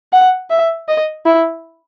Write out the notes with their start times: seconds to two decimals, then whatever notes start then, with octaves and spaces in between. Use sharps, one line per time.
0.12 F#5
0.50 E5
0.89 D#5
1.26 E4